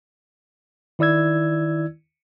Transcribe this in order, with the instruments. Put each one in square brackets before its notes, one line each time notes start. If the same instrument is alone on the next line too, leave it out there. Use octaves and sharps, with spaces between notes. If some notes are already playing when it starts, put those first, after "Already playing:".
[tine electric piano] D#3 E4 D5 E6 G#6